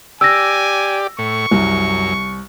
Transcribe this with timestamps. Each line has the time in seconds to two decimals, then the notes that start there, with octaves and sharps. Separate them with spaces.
0.21 G4 D5 G#5 E6 A#6
1.19 A2 C#6
1.51 C2 F#2